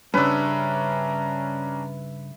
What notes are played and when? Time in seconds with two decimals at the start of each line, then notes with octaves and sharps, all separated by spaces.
0.14 G2 C#3 C#4 D4 B4 E5 A#5